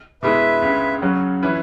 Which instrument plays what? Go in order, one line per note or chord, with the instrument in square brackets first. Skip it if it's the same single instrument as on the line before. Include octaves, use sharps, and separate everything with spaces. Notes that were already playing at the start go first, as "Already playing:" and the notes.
[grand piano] B2 G#3 E4 G#4 [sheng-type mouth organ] B4 E5
[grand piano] C#2 C#3 G#3
C#3 F#3 C#4 F#4
E3 C#4 E4 B4